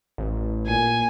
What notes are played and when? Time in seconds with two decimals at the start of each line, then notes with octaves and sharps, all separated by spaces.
0.18 A1
0.67 A#2 G#5